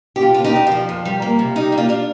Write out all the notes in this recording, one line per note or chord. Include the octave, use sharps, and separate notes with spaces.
G4
D3 F4
D2 F4
D#4 G4
D3 D#4
F3 F4
F2
G3
A#3
C3
G3 D#4
A#3
F4
D4 F4